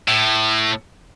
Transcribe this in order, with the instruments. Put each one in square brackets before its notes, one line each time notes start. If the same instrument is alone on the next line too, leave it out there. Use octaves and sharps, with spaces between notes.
[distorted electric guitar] A2